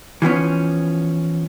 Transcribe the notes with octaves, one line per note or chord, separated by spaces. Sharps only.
E3 F3 B3 C#4